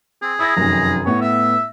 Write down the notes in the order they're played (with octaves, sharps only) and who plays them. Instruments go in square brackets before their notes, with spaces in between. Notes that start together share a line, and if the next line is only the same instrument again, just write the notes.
[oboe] C4 [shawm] G#4
[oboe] E4 [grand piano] D#6 A6 A#6
[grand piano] F1 F#2 D#3 [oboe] A#5
[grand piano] A2 B3 E4 [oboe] C#5
[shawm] E5 [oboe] E6